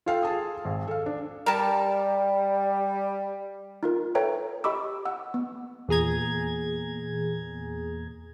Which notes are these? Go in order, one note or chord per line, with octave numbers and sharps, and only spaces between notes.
F4 A4 F5 G5
G#4 A5 D#6
G#1
A4 F5
D4
G3 A#4 A5
D#4 F4 A#4
A4 B4 C#5 E5 G5 A#5
G4 D#5 B5 C#6 D6 E6
F#5 E6
B3
E2 A#2 G#4 A#5 G#6